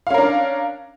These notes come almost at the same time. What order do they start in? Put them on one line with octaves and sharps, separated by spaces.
F5 C#4 A#4 D4